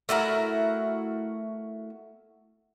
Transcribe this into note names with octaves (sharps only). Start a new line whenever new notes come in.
A3 E4 F#4 A#4